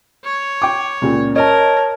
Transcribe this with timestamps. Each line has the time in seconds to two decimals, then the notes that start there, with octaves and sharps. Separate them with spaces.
0.25 C#5
0.62 G5 D6
1.02 C#2 A#2 C#3
1.36 A#4 C#5 D#5 A5